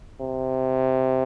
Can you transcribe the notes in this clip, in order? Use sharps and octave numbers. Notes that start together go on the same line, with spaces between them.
C3